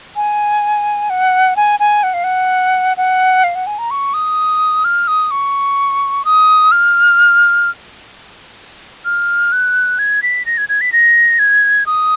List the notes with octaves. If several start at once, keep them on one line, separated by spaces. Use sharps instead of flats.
G#5
F#5
G#5
G#5
F#5
F5
F#5
F#5
F5
F#5
G#5
A#5
C#6
D#6
F6
D#6
C#6
D#6
F6
F6
F#6
G#6
B6
A#6
G#6
G#6
B6
A#6
G#6
D#6